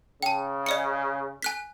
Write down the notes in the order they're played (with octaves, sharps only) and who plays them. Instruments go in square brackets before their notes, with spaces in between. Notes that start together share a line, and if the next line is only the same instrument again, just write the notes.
[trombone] C#3 [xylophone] G5 A5
[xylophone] D5 D#5 C#7
G#5 F#6 B6